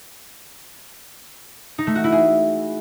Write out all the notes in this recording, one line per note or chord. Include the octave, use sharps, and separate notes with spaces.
D#4
A3
F#4
E4
G#4